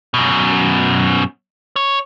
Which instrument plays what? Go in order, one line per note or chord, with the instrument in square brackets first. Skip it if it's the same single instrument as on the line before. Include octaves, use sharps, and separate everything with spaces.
[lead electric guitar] F#2 B2
C#5